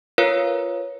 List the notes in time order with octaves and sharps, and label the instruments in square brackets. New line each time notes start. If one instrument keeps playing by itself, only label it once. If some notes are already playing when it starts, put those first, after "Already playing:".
[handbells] F4 A#4 B4 C#5 F5